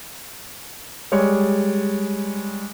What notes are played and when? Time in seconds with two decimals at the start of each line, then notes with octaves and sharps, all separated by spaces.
1.12 G3 G#3 C#5